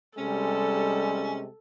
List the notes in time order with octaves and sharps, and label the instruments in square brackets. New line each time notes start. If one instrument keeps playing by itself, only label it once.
[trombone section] C3 G#3 [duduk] G3 [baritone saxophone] C#4 [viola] A4